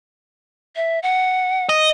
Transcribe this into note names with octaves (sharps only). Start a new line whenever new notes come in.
E5
F#5
D#5